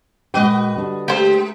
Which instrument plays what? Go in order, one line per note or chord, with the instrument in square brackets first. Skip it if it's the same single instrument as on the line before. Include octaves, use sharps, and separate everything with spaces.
[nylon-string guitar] A#2 G#3 G5 [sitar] F#4 B4 D#5
[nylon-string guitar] D3 G3 D4
[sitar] G#3 [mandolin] G4 C5